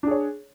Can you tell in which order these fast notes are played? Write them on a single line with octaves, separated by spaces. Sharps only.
D4 G#4 C#5